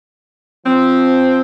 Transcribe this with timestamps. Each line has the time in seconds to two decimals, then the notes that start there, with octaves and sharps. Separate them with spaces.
0.66 F3 C4